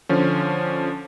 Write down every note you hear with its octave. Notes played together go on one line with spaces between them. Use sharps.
D3 F3 C#4